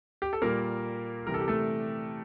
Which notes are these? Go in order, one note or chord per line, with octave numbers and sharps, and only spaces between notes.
G4
A4
A#2 G3 A#3 A#4
C3 E3 G3 A#4
A4
G4
A3 A4